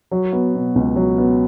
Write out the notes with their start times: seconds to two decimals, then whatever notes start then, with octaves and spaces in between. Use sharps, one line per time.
0.11 F#3
0.33 B3
0.54 B2
0.75 C#2
0.96 F#3
1.18 B3